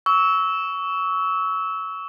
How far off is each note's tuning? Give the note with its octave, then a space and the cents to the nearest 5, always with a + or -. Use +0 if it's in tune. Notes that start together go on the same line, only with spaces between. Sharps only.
C#6 +25 E6 -20